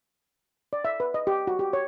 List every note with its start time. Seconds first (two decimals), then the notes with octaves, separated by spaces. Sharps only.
0.73 D5
0.85 E5
1.00 B4
1.14 D#5
1.27 G4
1.47 F#4
1.59 G4
1.73 C#5